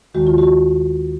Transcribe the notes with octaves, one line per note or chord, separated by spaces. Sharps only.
D#2 D#3 G#3 F#4
F4
F#4